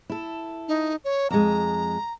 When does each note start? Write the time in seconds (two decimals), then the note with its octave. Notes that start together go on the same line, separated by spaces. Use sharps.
0.10 E4 A4
0.68 D#4
1.05 C#5
1.31 F2 G#3 A#5